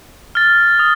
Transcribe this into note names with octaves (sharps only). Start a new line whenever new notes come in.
F6 A6
D#6